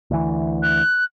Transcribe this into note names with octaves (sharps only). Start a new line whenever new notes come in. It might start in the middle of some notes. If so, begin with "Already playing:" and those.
D2 E3
F#6